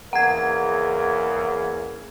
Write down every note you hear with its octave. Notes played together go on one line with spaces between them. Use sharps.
E2 C#3 A#3 F#5 G#6